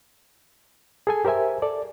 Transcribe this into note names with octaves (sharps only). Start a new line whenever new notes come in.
G#4 A4 G#5
G4 A#4 C5 E5 G#5
A4 D5